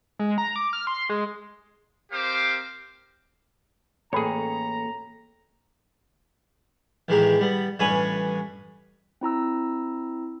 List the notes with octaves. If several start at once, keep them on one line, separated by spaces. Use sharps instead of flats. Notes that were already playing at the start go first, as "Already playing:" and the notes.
G#3
A#5
D6
F6
C6
G#3
C4 G4 A#4 C5 F5 D6
A1 A#3 G#4 A4 C#5 G5 A#5 B5
A1 D#3 E3 G#3 G4 A#5
G3 B3
A1 G2 B4 C#5 G#5 D#6
C4 E4 A#5 E6